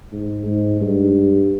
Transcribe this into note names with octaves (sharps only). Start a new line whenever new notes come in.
G#2
G#2
G2